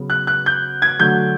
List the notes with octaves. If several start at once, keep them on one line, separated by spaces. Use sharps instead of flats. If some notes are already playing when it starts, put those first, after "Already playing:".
Already playing: C#3 F#3 B3
F#6
F#6
G6
G#6
D3 F#3 A3 G6